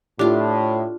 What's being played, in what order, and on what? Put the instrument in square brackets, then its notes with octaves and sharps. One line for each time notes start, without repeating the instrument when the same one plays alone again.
[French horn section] A2 [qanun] D4 F4 [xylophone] G4